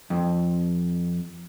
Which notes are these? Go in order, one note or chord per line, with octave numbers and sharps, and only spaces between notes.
F2